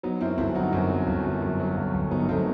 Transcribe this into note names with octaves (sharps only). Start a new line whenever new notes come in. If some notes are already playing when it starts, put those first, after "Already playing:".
F#3 B3 D#4
F#2 C4 E4
G1 C4 E4
F#3 D#4 F#4
F#2 C4 E4
F#3
G1
F#2
F#2
F#3
G1
G1
F#3 B3 D#4
G1 A3 C4